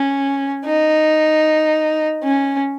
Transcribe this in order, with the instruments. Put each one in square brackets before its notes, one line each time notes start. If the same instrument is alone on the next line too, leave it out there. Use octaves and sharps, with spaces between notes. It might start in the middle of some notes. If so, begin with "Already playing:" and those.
Already playing: [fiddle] C#4
D#4
C#4